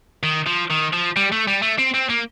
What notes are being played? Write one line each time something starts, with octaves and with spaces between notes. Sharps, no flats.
D#3
F3
D#3
F3
G3
A3
G3
A3
C4
C4
A#3